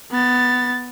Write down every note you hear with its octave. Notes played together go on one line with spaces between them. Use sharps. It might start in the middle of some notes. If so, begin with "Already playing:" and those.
B3 A6